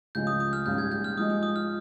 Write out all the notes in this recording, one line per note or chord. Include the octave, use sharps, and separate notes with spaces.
C#2 C#3 F3 G#3 C#4 G6
D#6
D#6
F6
A#1 G#2 G3 C#4 F4 G6
G#6
G6
F6
G#2 F3 G#3 D#6
D#6
D#6
F6